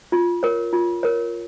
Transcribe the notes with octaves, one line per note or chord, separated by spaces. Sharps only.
F4
A#4 C#5
F4
A#4 C#5